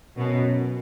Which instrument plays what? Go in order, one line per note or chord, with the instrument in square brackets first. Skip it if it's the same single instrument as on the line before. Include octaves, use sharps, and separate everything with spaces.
[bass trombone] F#2 [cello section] B2